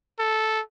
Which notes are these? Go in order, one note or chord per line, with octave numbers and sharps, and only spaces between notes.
A4